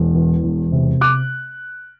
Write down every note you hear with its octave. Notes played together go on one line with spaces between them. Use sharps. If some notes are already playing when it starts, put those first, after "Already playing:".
Already playing: E1
E2
E1
C3
D6 F#6